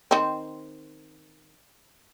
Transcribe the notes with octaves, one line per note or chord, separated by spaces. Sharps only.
D#3 C4